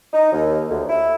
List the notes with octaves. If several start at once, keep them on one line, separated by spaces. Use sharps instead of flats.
D#4
D#2
D2
E4